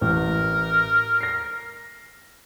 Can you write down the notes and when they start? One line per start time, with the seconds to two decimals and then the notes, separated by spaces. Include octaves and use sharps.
0.01 A1 A#4
1.21 A#6 C7